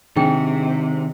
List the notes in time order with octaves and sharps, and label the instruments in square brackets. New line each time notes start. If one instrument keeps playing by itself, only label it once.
[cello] C3 [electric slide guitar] D#3 C4 [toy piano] D4 G#4 G5